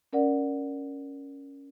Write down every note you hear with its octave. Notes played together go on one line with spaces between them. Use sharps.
C#4 A#4 D5 F#5